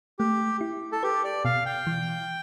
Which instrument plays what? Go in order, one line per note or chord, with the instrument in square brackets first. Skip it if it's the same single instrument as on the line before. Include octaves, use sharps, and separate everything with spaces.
[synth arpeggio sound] A3 [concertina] G4
[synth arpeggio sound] E4
[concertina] A4
[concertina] G4 [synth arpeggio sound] B4
[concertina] D5
[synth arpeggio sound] B2 [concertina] F5
[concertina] G5
[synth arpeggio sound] E3